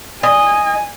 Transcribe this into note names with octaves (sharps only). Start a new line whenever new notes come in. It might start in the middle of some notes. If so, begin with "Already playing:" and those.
D#5 G#5